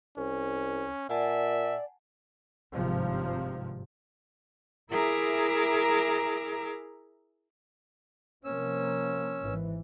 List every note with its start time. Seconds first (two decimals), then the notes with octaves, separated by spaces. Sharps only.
0.17 C2 C#4
1.10 A#2 D5 E5 F#5 G#5 A5
2.74 G#1 G2 C3 F3
4.91 E4 G#4 A#4 E5 A#5 D6
8.45 C3 F3 A#3 C#4 E6
9.41 G#1 G#2 E3